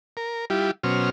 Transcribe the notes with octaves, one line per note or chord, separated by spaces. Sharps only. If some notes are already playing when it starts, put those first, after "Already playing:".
A#4
G3 E4 F4 G4
B2 F#3 C#4 C5 F6